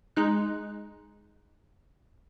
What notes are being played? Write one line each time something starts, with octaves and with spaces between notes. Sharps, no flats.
G#3 D#4 F#6